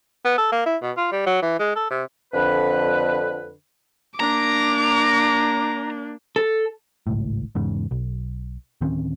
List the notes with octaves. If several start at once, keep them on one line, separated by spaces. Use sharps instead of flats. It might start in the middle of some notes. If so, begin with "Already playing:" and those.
B3
A4
A#3
E4
B2
F4
G3
F#3
E3
G#3
A4
C3
F2 D3 B4
A#3 D4 A#5 D6
A4
G#1 C#2 A2
E2 G#2 C#3
B1
D1 D#3 C4 C#4